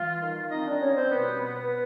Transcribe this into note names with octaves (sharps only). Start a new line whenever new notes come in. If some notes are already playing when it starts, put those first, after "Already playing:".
Already playing: E3 G3 F4 F5
D#3
C4 D#4 D#5
D4 D5
G3 C#4 C#5
C4 C5
B2 B3 B4
B3